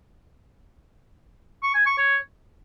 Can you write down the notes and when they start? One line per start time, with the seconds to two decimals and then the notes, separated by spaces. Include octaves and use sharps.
1.63 C#6
1.74 G#5
1.86 C#6
1.98 C#5